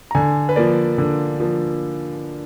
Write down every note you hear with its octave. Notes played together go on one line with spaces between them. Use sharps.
A#5
D3 G#5
B4
F3 A#3 D5
D3
F3 A#3